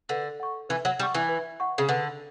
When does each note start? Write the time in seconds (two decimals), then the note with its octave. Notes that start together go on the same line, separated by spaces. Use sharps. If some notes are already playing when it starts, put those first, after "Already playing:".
0.09 D3 B4
0.40 F#5 C#6
0.69 E3 B4
0.85 F#3
0.99 G3 F#5 C#6
1.14 E3
1.29 B4
1.60 F#5 C#6
1.78 C#3
1.89 D3 B4